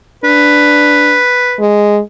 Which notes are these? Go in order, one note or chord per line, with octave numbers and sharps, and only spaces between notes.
D4 B4
G#3